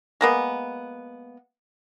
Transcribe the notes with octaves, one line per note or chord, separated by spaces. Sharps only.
G#3 A#3 B3